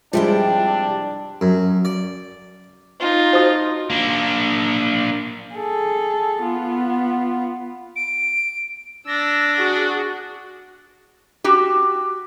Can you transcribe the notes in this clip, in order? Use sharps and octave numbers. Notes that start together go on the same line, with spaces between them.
C3 F3 G3 G#3 D4 E4 G5
F#2
D5
D#4 F4
F#4 C5
A#3 D4
G#4 A4
B3 F4
D7
D4 E6 A#6
F#4 G#4
F#4 G4